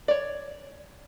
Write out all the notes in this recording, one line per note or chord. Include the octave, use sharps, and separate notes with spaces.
C#5 D5